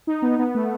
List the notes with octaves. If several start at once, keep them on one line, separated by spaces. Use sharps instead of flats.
D#4
B3
B3
A3